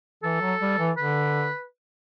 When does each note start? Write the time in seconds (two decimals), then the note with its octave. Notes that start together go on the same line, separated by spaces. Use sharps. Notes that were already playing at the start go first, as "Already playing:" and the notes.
0.23 E3 A4
0.41 F#3
0.61 G3
0.79 E3
0.97 D3 B4